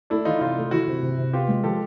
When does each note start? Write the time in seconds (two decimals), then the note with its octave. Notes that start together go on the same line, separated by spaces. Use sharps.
0.10 A3 D4 E4
0.25 E3 D#4 F4
0.41 C3 D#4 F4
0.57 A3
0.71 E3 E4 F#4
0.87 C3
1.03 C3
1.18 C3
1.33 B3 F4 G4
1.48 G#3
1.64 F3 G4 A4